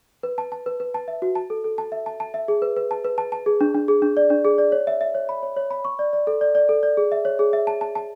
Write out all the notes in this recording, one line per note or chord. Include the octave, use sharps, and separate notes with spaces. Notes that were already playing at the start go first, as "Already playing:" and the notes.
B4
A5
A5
B4
B4
A5
E5
F#4
A5
A4
A4
A5
E5
A5
A5
E5
G#4
B4
B4
A5
B4
A5
A5
G#4
D4
D4
G#4
D4
D5
D4
G#4
D5
C#5
E5
E5
C#5
B5
C#5
C#5
B5
C#6
D5
D5
A4
D5
D5
A4
D5
G#4
E5
C#5
G#4
E5
A5
A5
A5